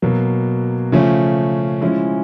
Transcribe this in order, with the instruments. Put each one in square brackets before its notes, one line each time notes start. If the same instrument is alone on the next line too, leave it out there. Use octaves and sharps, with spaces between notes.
[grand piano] B2 F#3 A#3
C#3 F3 A3 C#4
F3 G#3 C#4 E4